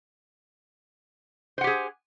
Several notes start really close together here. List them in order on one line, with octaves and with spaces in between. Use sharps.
C5 F#5 G4 G#4